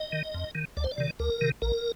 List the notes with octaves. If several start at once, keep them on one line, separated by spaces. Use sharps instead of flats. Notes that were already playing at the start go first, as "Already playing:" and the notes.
Already playing: D#5
D#3
F2
D#3
D2 D5
C5
D5
C3 D#3
D2 A#4
C3 D#3
A#1 A#4